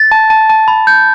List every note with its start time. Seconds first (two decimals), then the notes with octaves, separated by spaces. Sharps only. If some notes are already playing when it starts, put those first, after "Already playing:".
Already playing: A6
0.11 A5
0.30 A5
0.49 A5
0.68 B5
0.87 G6